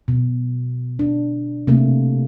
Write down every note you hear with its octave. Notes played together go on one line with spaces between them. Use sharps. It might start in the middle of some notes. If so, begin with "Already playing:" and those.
B2
D4
C3 A3 A#3